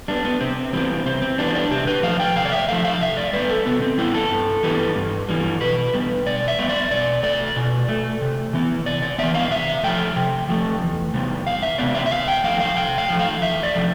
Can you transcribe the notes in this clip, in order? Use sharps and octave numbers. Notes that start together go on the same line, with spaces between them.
G3 B3 D4
B3
C3 C4
E3 G3 B3 C4
C3 C4
C4
E3 G3 B3 D4
D4
C3 G4
B4
F3 A3 F5
G5
C3 F5
D5
E5
F3 A3 F5
F5
C3 E5
D5
G3 B3 B4
A4
C3 B3
C4
G3 B3 E4
A4
G2
E3 G3 B3
G2
E3 G3 B3
B2 B4
G3 B3
B2 D5
E5
G3 B3
D5
B2 D5
A3 D5
B2
A3
C3
E3 B3
C3 D5
D5
E3 B3 E5
F5
C3 E5
F3 A3 G5
C3
F3 A3
E2
C3 G3 B3
E2 F5
E5
C3 G3 B3 D5
E5
E5
C3 F5
G5
F3 A3 F5
F5
C3 G5
F5
F3 A3
F5
E2 E5
D5
C3 F3 A3